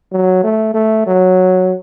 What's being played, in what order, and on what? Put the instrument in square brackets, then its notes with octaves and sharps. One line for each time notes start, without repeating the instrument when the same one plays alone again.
[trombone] F#3
A3
A3
F#3